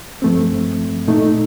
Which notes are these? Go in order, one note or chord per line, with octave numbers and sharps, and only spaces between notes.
G2 F3 A3 C4
A#2 A3 D#4